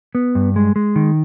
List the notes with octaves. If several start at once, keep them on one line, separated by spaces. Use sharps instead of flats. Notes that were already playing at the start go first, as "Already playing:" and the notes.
B3
G2
G#3
G#3
D#3